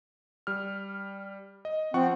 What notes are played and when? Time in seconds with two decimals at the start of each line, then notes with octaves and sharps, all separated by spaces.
0.47 G3 F6
1.65 D#5
1.94 F3 C4 F#5 C#6